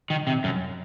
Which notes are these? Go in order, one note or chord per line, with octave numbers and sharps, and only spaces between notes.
D#3
C3
F#2